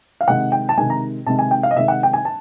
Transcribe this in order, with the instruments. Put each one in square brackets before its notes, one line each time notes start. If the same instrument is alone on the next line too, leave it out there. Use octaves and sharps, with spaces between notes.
[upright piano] F5
C3 D#3 G#3 F#5
G5
A5
C3 D#3 G#3 G#5
A#5
C3 D#3 G#3 A5
G#5
G5
F5
D#5
C3 D#3 G#3 E5
F#5
G5
G#5
A5